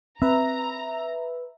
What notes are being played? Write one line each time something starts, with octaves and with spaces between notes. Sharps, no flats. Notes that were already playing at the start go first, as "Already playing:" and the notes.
C4 B4 E5 A#5